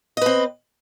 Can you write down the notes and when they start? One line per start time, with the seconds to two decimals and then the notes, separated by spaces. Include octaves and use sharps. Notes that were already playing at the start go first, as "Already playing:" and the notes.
0.17 D#5
0.21 B4
0.26 C4